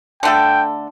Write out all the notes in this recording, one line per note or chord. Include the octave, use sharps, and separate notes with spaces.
D3 A3 A4 G5